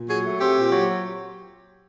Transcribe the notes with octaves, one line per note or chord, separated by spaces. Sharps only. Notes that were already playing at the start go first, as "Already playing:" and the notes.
Already playing: A#2
F#3 G#4
A3
C4 G4
A#2
F#3